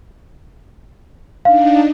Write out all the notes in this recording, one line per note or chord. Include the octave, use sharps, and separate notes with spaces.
D4 D#4 F5